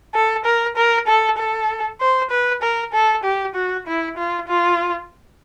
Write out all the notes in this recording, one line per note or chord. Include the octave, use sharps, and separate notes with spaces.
A4
A#4
A#4
A4
A4
C5
B4
A#4
A4
G4
F#4
E4
F4
F4